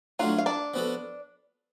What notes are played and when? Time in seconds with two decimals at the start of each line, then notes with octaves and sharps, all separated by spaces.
0.19 F#3 A3 D4 F4 F#4 F5
0.38 F5
0.46 D4 D5
0.74 F3 B3 F#4 A4